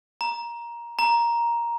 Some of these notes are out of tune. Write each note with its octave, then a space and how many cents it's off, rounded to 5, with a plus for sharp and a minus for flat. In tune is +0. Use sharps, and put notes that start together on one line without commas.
A#5 +15
A#5 +10